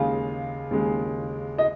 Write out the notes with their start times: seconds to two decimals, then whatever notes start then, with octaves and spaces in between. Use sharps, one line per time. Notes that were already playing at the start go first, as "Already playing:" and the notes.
Already playing: D#2 C#3 G#3 F5
0.71 D#2 C#3 G#3
1.58 D#5